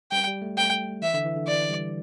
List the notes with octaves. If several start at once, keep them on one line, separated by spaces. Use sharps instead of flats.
G3 G5
G3
A3
A3 G5
E3 E5
D3
E3
D3
E3 D5
G3